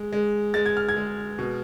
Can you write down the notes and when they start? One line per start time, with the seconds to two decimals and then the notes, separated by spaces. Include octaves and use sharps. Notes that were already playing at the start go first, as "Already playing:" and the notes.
Already playing: G#3
0.13 G#3
0.54 G#3 A6
0.66 G#6
0.77 F6
0.89 G#6
0.97 G#3
1.39 B2